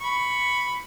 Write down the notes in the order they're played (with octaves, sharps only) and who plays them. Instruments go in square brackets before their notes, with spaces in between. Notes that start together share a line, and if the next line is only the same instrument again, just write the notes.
[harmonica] B5 C#6